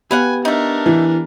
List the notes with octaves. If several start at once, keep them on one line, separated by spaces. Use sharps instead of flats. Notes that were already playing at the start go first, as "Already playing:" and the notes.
B3 G4 B4 F5 F#5 G#5
A3 D4 D#4 A#4
E3